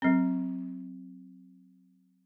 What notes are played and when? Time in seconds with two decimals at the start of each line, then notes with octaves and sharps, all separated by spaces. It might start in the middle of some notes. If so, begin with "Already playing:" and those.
0.02 F#3 C4